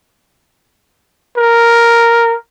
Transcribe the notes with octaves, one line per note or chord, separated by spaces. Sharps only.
A#4